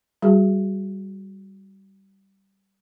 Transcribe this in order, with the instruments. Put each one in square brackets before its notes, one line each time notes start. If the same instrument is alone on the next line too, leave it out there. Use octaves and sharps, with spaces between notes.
[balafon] G3 F#4 G#4